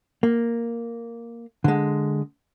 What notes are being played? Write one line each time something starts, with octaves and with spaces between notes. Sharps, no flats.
A#3
D3 G#3